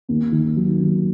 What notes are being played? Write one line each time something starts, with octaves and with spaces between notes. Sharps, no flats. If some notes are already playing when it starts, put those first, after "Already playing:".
D#2
D#3
F#3
D#2